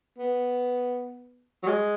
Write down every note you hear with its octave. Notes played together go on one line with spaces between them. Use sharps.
B3
F#3
G#3